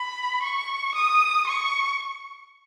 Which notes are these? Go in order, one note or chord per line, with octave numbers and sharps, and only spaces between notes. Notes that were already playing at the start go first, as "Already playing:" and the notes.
Already playing: B5
C#6
D#6
C#6